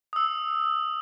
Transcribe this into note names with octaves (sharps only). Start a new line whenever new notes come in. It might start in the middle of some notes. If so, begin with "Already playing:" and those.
D#6 E6